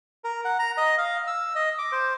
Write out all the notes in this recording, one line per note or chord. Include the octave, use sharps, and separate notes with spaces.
A#4
F#5
A#5
D#5
F5
E6
D#5
D6
C5